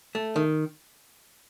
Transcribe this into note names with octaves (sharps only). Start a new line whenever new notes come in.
A3
D#3